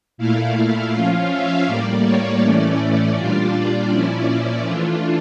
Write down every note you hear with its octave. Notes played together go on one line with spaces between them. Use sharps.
A#2 A3 E4 F5
F3 C#4 F4 F5
E5
A2 G3 A#3 D5
C#5
A2 E3 A3 C#4 D5
D5
A#2 G3 D4 F4
A#2 F3 C#4 E4
E3 A3 D4 F4